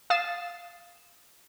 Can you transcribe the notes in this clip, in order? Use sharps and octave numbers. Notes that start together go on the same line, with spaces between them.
F5 D#6 A6 C7 E7